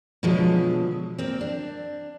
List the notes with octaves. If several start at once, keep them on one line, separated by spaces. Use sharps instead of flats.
B2 D3 F3 F#3 G#3
A#3 C4
D4